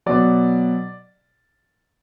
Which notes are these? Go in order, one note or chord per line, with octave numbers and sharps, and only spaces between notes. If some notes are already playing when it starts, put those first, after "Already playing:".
B2 F#3 D5